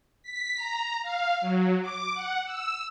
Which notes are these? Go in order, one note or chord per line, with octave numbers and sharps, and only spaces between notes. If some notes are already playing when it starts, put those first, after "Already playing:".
B6
A#5
F5
F#3
D6
F#5
E6